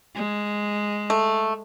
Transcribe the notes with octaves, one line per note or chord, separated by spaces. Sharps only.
G#3
A3